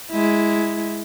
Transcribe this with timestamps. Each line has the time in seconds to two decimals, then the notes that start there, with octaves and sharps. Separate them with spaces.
0.11 G#3 E4